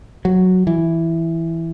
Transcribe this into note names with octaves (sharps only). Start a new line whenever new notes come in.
F#3
E3